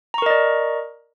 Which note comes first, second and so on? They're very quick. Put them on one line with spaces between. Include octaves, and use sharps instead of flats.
A#5 C#6 A#4 D#5 D5